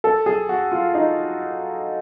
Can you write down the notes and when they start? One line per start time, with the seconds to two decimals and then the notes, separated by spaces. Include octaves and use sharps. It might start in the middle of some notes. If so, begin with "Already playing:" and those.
0.04 A4
0.26 G#4
0.49 F#4
0.72 F4
0.94 D#4